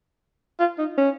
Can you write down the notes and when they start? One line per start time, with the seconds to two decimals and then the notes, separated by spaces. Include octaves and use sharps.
0.60 F4
0.79 D#4
0.98 C#4